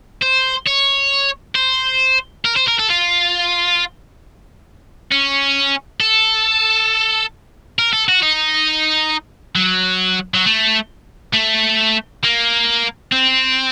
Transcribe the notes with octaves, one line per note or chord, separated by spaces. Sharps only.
C5
C#5
C5
A#4
C5
A#4
A4
F4
C#4
A4
A#4
A4
F#4
D#4
F#3
F#3
A3
A3
A#3
C4